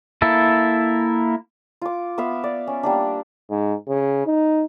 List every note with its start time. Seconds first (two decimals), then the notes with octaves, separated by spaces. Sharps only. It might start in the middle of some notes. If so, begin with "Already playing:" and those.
0.22 A#3 E4 A4
1.82 F4 D6
2.18 B3 E5 F5
2.44 D5
2.67 C#4
2.83 G3 A#3 D4
3.50 G#2
3.88 C#3
4.27 D#4